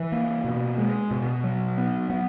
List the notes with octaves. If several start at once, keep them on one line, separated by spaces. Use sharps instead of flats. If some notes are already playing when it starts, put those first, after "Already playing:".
Already playing: E3
A#3
B2
G#3
B2
F#3
B3
B3